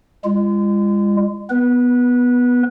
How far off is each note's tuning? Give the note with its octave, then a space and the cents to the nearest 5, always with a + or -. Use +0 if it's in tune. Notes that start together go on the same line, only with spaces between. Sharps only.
G#3 -35 F4 -35
B3 +0 B4 -25